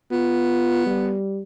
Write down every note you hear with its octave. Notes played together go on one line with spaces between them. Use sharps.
B3 F4
G3